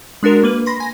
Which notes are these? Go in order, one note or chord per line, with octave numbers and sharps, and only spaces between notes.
G#3 D4 F#4 A#4
A#3 B4
B5 C6 A#6
G#5 A#6